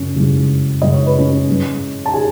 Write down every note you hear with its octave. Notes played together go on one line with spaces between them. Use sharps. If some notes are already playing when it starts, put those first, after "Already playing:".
Already playing: F#2 C#3 C#4
F#2 C#3 E3 G#3
F#2 C#3 E3 G#3 D#5
C#5
B4
C#4 C#5
G#2 E3 G#3
A5
E3 G#4 G#5